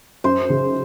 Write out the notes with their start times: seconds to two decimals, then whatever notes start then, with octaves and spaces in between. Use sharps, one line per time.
0.24 F#2 C5
0.49 C#3